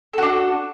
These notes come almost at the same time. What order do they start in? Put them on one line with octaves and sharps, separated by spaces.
A4 F#4 D4